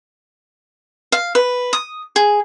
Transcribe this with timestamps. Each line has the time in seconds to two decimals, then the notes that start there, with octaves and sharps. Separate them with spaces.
1.12 F5
1.35 B4
1.73 D#6
2.16 G#4